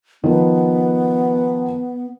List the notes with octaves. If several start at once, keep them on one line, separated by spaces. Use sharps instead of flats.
D#3 F3 B3